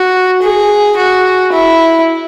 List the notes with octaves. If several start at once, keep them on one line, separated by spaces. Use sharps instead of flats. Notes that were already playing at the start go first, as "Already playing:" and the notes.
Already playing: F#4
G#4
F#4
E4